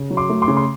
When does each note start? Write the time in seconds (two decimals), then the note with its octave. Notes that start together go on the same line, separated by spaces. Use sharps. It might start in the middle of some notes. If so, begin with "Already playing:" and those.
Already playing: C#3
0.10 F#3
0.17 C6 D6
0.30 A3
0.42 C6 D6
0.48 C#3
0.57 C6